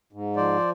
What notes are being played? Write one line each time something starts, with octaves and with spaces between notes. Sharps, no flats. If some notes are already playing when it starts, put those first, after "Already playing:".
G#2
F3 C5 D5